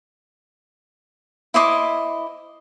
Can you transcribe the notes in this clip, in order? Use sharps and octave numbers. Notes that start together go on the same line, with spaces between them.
E4 C5 D#5 D6